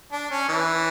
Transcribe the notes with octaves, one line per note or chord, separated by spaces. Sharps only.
D4
C#4
E3